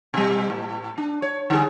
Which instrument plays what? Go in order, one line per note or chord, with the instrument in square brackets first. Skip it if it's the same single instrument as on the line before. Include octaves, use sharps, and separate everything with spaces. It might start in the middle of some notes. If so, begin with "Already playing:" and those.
[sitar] B2 G3
A2
D4
C#5
D3 G3 G#4